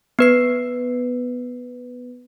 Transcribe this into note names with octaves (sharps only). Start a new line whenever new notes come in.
B3 B4 C7